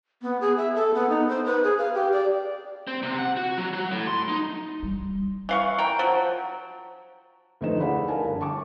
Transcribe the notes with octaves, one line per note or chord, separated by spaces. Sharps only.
B3
G#4
E5
A4
B3
D#4
C5
B4
G#4
F5
G4
D5
C4
C3
F#5
F#4
F#3
F#3
A2
C6
D#4
G3
E3 F5 C#6
A#4 G5
F3 F#3
D2 F3 A3 D#4 B4 E7
E4 G#4 D5 F5 F#5 B5
A#4 F5 G#5 A5
G1
A5 C#6 D6